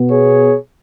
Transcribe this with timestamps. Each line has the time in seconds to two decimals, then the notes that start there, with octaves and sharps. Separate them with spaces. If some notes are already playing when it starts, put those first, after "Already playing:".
Already playing: B2 B3
0.10 G#4 C#5